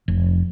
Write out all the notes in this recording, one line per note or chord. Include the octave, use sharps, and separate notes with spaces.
F1